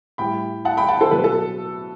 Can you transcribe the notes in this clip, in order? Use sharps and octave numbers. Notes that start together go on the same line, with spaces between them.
A2 G3 G5 B5
F#5 A5
G5 B5
F#5 A5
A4 C5
B2 F#3 B4
A4